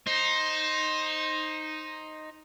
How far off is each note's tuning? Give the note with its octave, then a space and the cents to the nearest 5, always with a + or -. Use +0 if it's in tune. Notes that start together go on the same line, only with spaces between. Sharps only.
D#4 +0 C5 +15